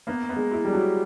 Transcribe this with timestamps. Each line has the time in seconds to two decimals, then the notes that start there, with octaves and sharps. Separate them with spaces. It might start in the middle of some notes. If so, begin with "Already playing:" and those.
0.07 A#3 B3
0.29 B3
0.36 G#3
0.51 E4
0.65 G3
0.72 F#3